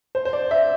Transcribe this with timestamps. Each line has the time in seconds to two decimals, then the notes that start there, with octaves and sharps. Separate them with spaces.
0.15 C5
0.25 C5
0.33 D5
0.51 E5